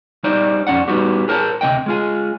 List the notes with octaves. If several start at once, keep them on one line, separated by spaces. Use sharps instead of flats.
G3 D#4 C5 D5
F2 C#4 D5 F#5
G3 B3 D#4 F#4 G4
G#4 A#4 C5 F#5 A5
D2 C3 G#3 D#5 G5
G#3 F4 G#4